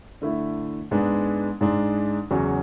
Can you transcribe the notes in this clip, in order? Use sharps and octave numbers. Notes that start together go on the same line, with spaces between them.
D3 A3 E4
G#2 G#3 B3 D4
G#2 G#3 D4
E2 C#3 F#3 C#4